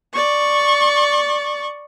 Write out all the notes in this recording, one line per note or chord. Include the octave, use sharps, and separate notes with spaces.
D5 C#6